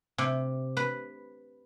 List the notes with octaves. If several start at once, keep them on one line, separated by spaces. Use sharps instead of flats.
C3
B4